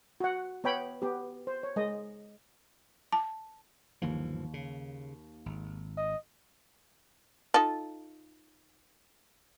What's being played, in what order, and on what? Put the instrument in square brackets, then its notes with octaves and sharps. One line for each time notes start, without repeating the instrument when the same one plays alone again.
[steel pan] F#4 F#5
B3 C#5 G5 B5
B3 G4
C5
C#5
G#3 D#5
[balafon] A5
[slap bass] G1 E3 F3 [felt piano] D#2
[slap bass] C#3
G#1
[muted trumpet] D#5
[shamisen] D#4 F4 A4